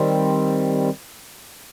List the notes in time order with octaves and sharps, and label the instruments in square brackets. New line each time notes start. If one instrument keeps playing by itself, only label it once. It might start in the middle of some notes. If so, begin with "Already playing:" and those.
Already playing: [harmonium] D#3 G3 C4